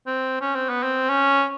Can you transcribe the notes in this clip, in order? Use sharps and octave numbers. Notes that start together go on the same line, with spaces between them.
C4
C#4
C4
B3
C4
C#4